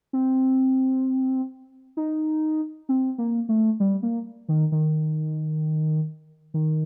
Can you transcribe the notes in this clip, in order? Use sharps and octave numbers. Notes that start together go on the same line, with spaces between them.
C4
D#4
C4
A#3
A3
G3
A#3
D#3
D#3
D#3